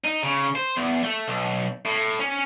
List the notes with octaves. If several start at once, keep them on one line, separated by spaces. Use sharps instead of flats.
D#4
C#3
C5
E2
A3
B1
A2
C#4